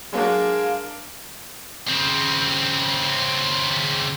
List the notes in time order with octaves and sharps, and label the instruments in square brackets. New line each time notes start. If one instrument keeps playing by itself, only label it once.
[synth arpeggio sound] F#3 A#3 F#4 [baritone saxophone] G#3 [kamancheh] D4 A#4 [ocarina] F5
[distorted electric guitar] C#3 C4